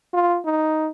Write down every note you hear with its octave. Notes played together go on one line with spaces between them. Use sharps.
F4
D#4